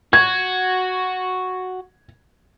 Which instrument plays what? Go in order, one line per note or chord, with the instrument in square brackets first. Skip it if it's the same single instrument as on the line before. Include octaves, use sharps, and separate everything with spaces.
[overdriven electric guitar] F#4 [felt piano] G#6